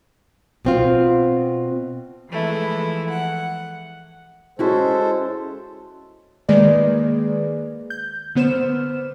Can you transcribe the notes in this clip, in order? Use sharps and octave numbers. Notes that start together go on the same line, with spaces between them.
B2 C4 F4
E3 F3 G#3 A3 E4
F#5
G#3 C#4 E4 F#4 A4 C5
D#3 G#3 A#3 G#4 B4 D5
G6
D3 B3 C5 F6 E7